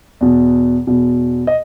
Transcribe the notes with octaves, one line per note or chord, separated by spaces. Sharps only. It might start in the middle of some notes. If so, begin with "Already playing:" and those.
E2 B2
E2 B2
D#5